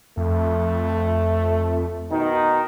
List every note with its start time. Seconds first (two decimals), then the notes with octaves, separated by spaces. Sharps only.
0.17 F2 A3
2.11 B2 D#3 D#4